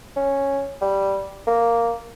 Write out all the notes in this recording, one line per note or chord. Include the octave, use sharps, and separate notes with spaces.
C#4
G3
A#3